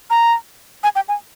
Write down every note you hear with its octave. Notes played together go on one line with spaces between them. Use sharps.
A#5
G#5
G5
G#5